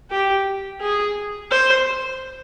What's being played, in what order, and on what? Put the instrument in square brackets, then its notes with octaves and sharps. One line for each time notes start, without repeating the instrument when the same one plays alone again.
[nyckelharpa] G4
G#4
C5